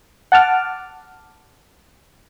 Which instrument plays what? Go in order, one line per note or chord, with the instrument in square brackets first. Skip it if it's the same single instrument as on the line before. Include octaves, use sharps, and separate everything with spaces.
[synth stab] F#5 A5 D6 F6